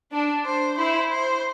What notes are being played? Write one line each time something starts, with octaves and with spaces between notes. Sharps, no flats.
D4
C5
E4 C5
C5